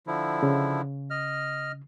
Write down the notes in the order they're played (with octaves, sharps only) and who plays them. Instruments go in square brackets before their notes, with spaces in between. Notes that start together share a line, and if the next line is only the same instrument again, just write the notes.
[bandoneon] D3 F3 E4
[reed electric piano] C#3
[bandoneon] D#5 F6